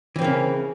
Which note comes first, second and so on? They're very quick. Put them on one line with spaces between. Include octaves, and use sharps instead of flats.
E3 C4 A#3 C#3